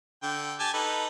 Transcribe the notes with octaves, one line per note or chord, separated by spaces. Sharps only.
D3 G5
G4 G#5 A5
D#4 A4 B4